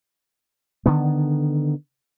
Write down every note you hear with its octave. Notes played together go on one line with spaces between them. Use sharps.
D3 D#3 B3